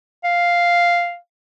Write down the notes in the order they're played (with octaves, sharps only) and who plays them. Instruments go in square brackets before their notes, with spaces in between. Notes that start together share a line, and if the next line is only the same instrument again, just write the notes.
[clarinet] F5